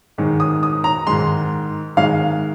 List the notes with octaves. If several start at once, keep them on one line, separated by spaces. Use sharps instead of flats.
G#2 D#3 G#3
D#6
D#6
A#5
G#2 D#3 G#3 C6
G#2 D#3 G#3 F5